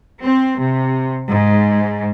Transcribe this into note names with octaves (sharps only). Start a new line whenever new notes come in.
C4
C3
G#2